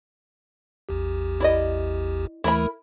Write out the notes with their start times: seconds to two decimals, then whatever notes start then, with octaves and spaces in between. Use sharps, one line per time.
0.89 A1 E2 G4
1.40 E4 D5 D#5
2.44 D#2 E3 A3 E4 A#4 B5